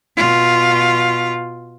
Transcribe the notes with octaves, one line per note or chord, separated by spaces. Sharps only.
B2 F4